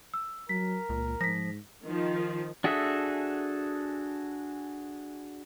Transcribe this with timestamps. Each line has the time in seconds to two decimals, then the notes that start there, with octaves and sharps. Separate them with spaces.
0.14 E6
0.49 F#3 A#4 B6
0.89 C#2 A#2
1.21 G#2 F3 A#6 B6
1.84 D#3 F3
2.64 D4 F#4 G#4 A4 E5